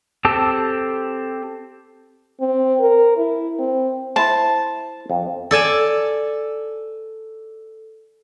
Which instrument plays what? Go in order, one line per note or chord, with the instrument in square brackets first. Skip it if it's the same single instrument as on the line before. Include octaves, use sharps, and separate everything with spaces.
[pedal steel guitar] C4 G4 A4 A5 E6
[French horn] C4
A#4
E4
C4
[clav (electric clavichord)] E4 C5 [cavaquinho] A5
[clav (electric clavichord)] F2
[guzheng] A4 D5 G#5 A5